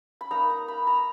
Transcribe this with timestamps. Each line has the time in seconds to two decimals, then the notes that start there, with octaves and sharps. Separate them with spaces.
0.21 B5
0.31 A#3 D#4 A#5
0.50 A#5
0.68 B5
0.87 A#5